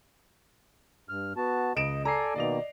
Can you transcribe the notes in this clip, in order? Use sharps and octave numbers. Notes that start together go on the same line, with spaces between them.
G2 F6
B3 F#4 A5
C#2 D#5 D7 E7
A4 D5 G#5 A#5 C7
B2 D#3 A#3 D5 D#5 F7